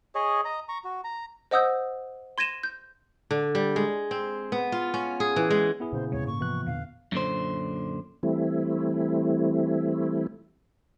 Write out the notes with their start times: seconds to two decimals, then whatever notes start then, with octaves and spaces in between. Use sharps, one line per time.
0.15 G#4 C#5 D#5
0.45 D#5 A#5
0.69 A#5 C#6
0.84 F#4
1.04 A#5
1.51 C5 D#5 F#5 D#6 E6 G6
2.38 C6 G#6 A#6 D#7 E7
2.63 G6
3.31 D3
3.55 G3
3.76 G#3
4.11 C4
4.52 B3
4.72 F4
4.94 C#4
5.20 G#4
5.36 E3
5.51 G#3
5.80 B3 E4 G#4
5.93 A#2 C#3 C5
6.12 D#2 C3 G#3 C#5
6.27 G#2 A#3 C#6
6.41 C3 E3 F3 B3 F#6
6.66 E2 A#2 D3 F5
7.12 F#2 A#2 D3 C5
8.23 E3 G3 A3 C4 E4